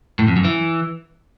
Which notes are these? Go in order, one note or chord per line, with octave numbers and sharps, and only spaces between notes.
A2
F2
F#2
E3